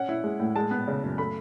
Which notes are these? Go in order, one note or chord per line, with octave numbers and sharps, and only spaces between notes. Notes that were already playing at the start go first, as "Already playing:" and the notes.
Already playing: C#4 F#5
E4
G#3
A2
G#3 A5
B3
C#3
F#2
A3 B5